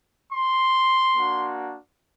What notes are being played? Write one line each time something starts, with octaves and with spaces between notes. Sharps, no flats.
C6
A#3 D4 F#4